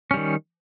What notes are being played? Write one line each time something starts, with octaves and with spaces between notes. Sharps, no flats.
D#3 G3 C#4